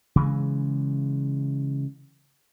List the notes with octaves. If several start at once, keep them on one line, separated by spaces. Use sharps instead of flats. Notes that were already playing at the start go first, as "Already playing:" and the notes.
C#3 E3 G#3